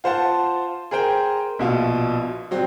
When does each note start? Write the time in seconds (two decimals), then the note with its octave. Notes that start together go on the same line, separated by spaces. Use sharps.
0.04 F4 C5 F#5 A5
0.91 G#4 A#4 C5 G5
1.59 A#1 B2 F4
2.51 F#3 G3 C4